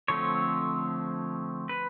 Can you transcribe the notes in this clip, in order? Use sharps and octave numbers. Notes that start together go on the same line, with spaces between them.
D3 F3 A3 C4 C#5
B4